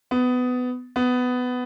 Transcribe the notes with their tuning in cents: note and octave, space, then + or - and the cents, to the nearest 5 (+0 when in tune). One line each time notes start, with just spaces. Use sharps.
B3 +20
B3 +15